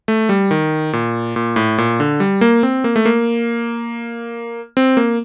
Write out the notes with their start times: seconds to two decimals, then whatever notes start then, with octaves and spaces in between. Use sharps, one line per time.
0.08 A3
0.29 G3
0.51 D#3
0.93 A#2
1.36 A#2
1.56 A2
1.78 A#2
2.00 D3
2.20 G3
2.41 A#3
2.63 C4
2.84 A#3
2.96 A3
3.05 A#3
4.77 C4
4.97 A#3